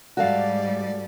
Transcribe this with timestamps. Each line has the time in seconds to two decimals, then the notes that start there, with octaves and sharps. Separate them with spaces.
0.17 G#2 G3 F#4 A4 D5 F5